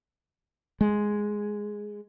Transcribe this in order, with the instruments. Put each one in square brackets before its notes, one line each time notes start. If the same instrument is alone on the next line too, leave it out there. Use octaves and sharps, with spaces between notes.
[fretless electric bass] G#3